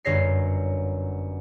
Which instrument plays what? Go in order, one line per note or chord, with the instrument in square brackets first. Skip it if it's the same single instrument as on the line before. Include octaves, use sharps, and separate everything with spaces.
[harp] G1 F#2 C#5 A#6 C7